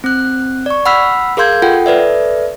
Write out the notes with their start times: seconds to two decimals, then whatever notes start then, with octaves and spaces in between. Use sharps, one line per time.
0.04 C4 F#6
0.66 D5 C#6
0.86 F#5 B5 E6 F6 B6
1.37 G#4 A#4 F5 C6 G6 G#6
1.62 F4 A4 F#5 G5
1.86 A4 B4 D5 E5